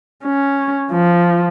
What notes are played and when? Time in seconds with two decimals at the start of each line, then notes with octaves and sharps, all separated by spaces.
0.24 C#4
0.91 F3